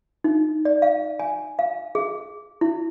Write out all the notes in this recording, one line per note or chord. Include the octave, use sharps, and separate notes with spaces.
D#4
D5
F5
G#5
F5
G#4
E4